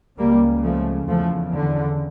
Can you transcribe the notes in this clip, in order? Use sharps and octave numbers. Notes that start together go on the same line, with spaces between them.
C#2 C#3 G3 A#3
F3 A3
E2 C#3 F3 A3
D3